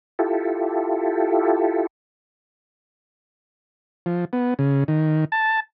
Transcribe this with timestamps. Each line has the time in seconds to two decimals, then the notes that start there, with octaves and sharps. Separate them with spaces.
0.19 E4 F4 G4 A4
4.06 F3
4.33 B3
4.59 C#3
4.88 D#3
5.32 A5